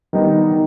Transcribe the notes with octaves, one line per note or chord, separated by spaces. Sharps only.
D#3 G3 B3 D#4
D#3